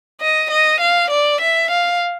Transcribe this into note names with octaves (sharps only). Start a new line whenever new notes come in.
D#5
D#5
F5
D5
E5
F5